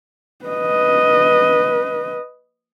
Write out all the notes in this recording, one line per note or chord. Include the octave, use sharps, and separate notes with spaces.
B4 D#5